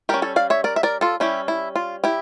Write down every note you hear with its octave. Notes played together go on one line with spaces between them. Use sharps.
G3 C#4 G4 A#4
A4 C#5
D5 F5
C#5 E5
A#4 D5
E5
A#4 D5
F4 A4
G3 C#4 E4 G4
E4
F4
E4 G4